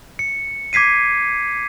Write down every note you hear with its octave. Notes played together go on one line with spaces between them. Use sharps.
C#7
D6 G#6 B6 C7 D#7